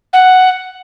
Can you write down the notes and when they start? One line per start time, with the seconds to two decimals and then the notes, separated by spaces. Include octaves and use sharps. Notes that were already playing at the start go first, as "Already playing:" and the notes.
0.13 F#5